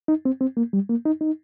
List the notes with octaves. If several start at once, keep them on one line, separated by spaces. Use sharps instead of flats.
D#4
C4
C4
A#3
G3
A#3
D#4
D#4